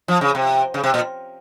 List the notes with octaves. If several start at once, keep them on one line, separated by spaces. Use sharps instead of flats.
F3
C#3
C3
C#3
C3
A#2